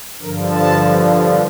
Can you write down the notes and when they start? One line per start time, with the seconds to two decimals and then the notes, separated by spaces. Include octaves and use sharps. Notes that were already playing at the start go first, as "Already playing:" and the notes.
0.21 G2 D3 F3 A#4
0.51 A5